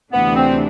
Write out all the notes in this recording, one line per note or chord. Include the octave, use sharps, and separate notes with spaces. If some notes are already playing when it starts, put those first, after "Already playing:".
D2 C3 E3 A3 B3 D4
C4